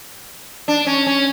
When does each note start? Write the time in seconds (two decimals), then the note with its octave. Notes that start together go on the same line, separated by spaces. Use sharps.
0.68 D4
0.86 C#4
1.06 C#4